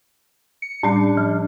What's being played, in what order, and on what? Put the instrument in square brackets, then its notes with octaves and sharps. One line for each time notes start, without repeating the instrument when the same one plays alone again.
[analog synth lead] C#7
[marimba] A2 G3 C#4 [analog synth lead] D4
[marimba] F3